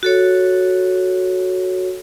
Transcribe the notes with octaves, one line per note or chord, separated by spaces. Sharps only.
F#4 A4 C#5